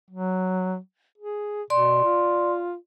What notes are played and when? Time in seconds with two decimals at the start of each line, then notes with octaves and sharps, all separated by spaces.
0.10 F#3
1.18 G#4
1.70 B2 D5 C6
2.04 F4